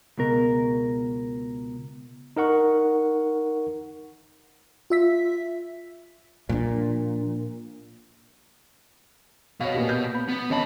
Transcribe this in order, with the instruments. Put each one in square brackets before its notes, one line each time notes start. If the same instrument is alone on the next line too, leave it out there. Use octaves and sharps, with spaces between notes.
[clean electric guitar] C#2 B2 A#4
[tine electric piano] D#4 A#4 F#5 C#6
[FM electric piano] F4 E5 B6
[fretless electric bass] A#2 [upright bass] F3 D4
[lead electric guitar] B2 [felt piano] C#5 F5
[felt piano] A#2 B3 G4
G6
B5
[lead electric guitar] B3
[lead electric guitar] D#3 B5 [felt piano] C#4 D#5 A5